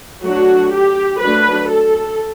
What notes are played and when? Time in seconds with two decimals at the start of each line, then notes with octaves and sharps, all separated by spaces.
0.24 F#3 A3 D4 F#4
0.72 G4
1.20 F#3 A3 D4 B4
1.69 A4